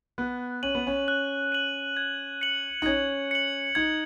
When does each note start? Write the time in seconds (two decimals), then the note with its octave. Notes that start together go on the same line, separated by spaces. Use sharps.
0.18 B3 F#6
0.63 C#4 D#7 F#7
0.75 B3
0.87 C#4
1.08 F#6
1.52 D#7 F#7
1.97 G#6
2.41 C#7 F#7
2.82 D#4
2.86 C#4 G#6
3.31 C#7 F#7
3.75 D#4 G#6